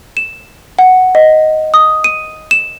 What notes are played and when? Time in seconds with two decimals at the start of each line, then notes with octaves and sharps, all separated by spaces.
0.17 E7
0.79 F#5
1.15 D#5
1.74 D#6
2.04 D#7
2.51 E7